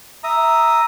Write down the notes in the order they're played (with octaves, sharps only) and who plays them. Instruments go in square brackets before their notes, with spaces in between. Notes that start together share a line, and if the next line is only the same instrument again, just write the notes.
[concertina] E5 A#5 D#6